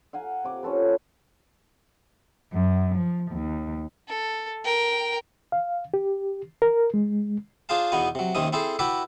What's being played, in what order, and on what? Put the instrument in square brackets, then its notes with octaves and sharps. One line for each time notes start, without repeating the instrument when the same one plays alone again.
[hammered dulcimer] F5 F#5 G#5 A#5
C3 D6
C#4 F4 A4 B4
[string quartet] F#2
F3
D#2
[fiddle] A4
A#4 G5
[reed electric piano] F5
G4
A#4
G#3
[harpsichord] D4 F4 G#4 C5 F5 A5
E2 B2 B3 D#4 G#5
C3 F#3
D#2 C3 D#3 C4 C#4 D#6
C4 E4 G#4 A4 C5
E4 F#4 G4 B4 D5 E5